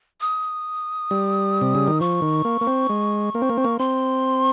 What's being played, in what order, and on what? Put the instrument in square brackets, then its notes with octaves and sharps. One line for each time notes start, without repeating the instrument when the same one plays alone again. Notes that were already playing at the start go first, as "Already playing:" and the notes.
[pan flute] D#6
[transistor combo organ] G3
C3
C#3
D#3
[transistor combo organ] F3 [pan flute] C#6
[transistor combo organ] D#3
A#3
A#3
C4
G#3
A#3
C4
A#3
C4
A#3
[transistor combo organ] C4 [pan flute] C6